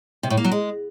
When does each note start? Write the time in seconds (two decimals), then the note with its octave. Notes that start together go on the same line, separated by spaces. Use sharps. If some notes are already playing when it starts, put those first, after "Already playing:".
0.23 C3
0.30 A2
0.37 A#3
0.44 F#3
0.52 G#3